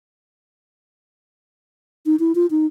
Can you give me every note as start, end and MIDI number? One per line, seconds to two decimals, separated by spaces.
2.06 2.16 63
2.19 2.32 64
2.35 2.46 65
2.51 2.66 63